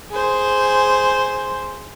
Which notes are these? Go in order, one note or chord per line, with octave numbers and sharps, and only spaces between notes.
G#4 C5